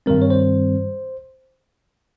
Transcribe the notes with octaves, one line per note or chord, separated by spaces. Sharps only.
G2 D#3 G3 C4 A#4
C#5
C5